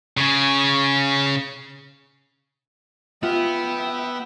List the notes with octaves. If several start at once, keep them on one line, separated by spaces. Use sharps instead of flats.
C#3 G#4
B3 F4 E5 G5